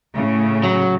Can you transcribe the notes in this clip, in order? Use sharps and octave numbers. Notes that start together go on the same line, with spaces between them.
A2 C#3
F#3